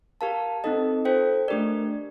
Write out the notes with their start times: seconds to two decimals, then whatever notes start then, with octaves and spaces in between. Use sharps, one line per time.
0.21 G4 A#4 F5 A5
0.64 C4 D#4 A4 D#5
1.05 F4 A4 C5 G5
1.48 A3 D4 G4 A#4 D5